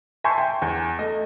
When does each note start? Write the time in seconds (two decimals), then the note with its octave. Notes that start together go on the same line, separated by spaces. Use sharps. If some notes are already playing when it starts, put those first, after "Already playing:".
0.24 E5 G#5 A5 C6 C#6 G6
0.38 G5
0.62 E2
0.99 A3 D#5